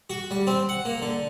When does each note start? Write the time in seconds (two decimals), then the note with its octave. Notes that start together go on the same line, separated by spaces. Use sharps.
0.10 F#4
0.31 G3
0.47 C4
0.69 F#5
0.85 A#3
1.02 D3